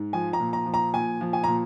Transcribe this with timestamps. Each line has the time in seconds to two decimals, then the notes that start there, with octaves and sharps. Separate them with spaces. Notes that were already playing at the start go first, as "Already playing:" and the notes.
Already playing: G#2
0.13 F3 G#5
0.33 A#5
0.40 A#2
0.53 A#5
0.66 F3
0.74 A#5
0.93 A#2 G#5
1.21 F3
1.33 G#5
1.44 A#2 A#5